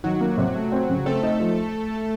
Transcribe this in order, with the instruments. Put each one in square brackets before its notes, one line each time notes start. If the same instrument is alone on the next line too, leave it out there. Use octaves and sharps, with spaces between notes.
[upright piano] D#3 [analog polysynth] F#3 F#4
[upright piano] A#3
C3
A3
C4
C#3
[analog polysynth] A3 A4 [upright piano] C4
[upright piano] D#4
F3